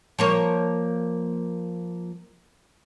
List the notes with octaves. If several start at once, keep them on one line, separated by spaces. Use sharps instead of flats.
F3 A#3 C#5